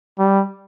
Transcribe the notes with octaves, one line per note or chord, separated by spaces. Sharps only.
G3